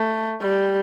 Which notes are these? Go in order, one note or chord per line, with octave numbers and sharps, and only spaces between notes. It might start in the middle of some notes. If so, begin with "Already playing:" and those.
Already playing: A3
G3